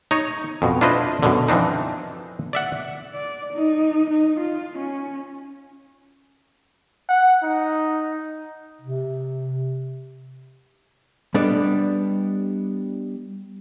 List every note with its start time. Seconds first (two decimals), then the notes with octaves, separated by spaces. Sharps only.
0.11 D#4 C#5 D#5
0.62 F2 B2
0.81 D4 E4 F4 B4 C5 D#5
1.23 F#2 B2 D3
1.48 E3 F3 C4 D4 D#4
2.53 D5 E5 F#5
3.13 D5
3.54 D#4
4.10 D#4
4.40 F4
4.78 C#4
7.09 F#5
7.43 D#4
8.82 C3
11.34 G3 B3 D4 A4 D#5